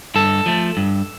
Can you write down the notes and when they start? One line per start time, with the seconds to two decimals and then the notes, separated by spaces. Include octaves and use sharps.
0.15 G2 A4
0.46 F3 A3
0.77 G2